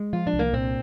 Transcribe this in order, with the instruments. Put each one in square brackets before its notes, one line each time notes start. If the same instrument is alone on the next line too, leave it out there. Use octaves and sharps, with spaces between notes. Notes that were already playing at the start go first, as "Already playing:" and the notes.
Already playing: [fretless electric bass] G#3
[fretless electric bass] F3 [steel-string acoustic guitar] F4
[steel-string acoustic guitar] D4
[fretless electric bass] C2
[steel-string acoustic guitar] A#3
[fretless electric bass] A#2 [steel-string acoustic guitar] C4